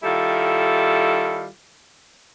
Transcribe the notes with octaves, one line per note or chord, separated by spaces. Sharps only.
D#3 G3 E4 F4 A4